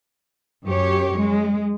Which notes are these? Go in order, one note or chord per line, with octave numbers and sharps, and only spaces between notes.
F#2 G4 C#5
G#3